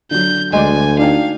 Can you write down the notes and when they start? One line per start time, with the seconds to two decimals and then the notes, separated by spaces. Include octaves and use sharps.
0.11 D3 F#3 G6
0.53 D2 G#3 F#4 D5 G#5
0.99 D4 D#4 F5 G5